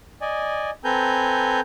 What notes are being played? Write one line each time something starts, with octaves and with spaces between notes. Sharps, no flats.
D5 D#5 G#5
C4 A4 B4 G#5 A#5 G6